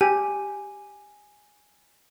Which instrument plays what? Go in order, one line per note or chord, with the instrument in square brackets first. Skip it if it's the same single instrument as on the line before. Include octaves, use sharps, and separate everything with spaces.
[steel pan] G4 [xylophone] G#5